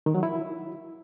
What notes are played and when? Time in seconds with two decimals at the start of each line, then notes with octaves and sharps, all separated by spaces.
0.06 D#3
0.15 F#3
0.23 E4